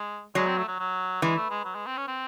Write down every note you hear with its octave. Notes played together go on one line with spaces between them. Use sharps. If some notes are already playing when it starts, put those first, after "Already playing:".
Already playing: G#3
F#3 G#3
C4
A3
F#3
F#3
E3 G#3
A3
G#3
F#3
G#3
C4
C#4
C4